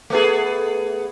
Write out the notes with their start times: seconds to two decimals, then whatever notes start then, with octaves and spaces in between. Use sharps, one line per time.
0.10 A3 B3 G#4